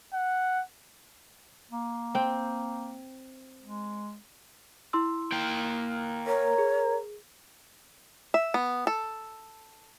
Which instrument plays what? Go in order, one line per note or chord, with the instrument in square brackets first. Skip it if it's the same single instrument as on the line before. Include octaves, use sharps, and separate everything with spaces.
[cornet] F#5
[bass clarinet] A#3
[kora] C4 G5
[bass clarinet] G#3
[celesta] E4 C6 E6
[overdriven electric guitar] A#3 G5
[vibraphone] A#4 A#5 [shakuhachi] C#5
[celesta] G#4
[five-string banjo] E5
B3
A4